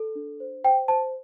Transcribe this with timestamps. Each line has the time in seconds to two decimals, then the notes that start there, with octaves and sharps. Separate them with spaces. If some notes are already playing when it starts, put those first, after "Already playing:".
Already playing: A4
0.15 D4
0.40 C5
0.64 C5 G5
0.88 C5 A5